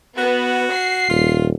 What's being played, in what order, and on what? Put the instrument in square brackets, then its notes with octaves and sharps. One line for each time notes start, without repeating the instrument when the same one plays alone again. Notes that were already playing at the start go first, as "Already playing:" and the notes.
[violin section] B3 [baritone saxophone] F#4
[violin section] C7
[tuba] D#1 [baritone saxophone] F4